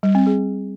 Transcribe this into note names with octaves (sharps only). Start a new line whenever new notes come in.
G3
C4
G#4